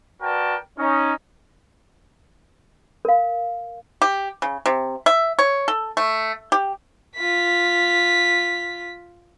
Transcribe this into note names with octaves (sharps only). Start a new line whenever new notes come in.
F#4 A#4 B4 D5 G5 A5
C#4 D#4
A#4 F5
G4
C#3
C3
E5
C#5
A4
A3
G4
F4 B6